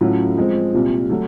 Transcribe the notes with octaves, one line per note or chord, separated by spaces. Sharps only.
A2 F#3 A3 C#4 F4
F3 G#3 C4
C2 A#2 G3
F#3 A3